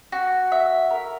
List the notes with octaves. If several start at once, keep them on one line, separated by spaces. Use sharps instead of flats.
F#4
E5
A#4